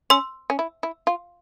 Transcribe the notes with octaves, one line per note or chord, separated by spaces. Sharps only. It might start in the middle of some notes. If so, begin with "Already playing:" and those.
C#4 C6 E6
C#4
E4
E4
F4